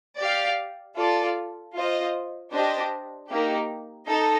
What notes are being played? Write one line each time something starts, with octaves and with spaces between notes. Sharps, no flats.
G4 D5 F5
F4 A4 D5
F4 C5 D#5
D4 G4 C5 D#5
A#3 D#4 G4
D#4 A4 D#5